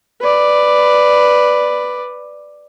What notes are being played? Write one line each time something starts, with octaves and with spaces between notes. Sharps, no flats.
B4 D5